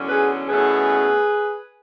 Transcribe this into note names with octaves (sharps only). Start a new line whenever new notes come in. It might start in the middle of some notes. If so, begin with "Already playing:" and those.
Already playing: E2 D3 F#3 C#4
G#4 B4
E2 B2 A3 C#4 G#4 B4